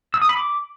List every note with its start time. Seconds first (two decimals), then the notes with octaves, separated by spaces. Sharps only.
0.14 E6
0.22 D#6
0.29 B5
0.37 D6